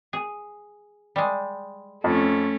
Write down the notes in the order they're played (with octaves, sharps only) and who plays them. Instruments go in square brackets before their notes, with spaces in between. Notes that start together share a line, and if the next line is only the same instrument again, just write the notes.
[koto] G#4
G3 G#3
[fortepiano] F2 [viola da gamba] A3 C#4